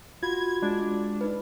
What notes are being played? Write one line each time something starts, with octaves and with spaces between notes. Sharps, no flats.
F4 F#4 B5 G#6
G#3 D4
D#4 B4